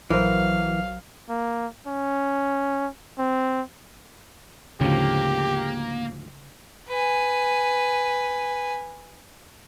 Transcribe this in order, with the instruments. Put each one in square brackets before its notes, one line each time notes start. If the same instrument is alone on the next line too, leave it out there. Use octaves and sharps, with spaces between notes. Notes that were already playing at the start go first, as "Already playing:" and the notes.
[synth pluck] A#1 A#4 C5 [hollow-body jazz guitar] E3 [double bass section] F#3 [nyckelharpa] F5
[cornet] A#3
C#4
C4
[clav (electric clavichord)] D2 G#2 F3 [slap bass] C#3 [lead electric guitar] A#3 [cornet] G4
[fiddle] B4 G#5